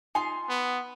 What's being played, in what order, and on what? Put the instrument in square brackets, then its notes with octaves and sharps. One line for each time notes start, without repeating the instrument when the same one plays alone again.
[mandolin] D#4 F4 C6 [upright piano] G#5
[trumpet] B3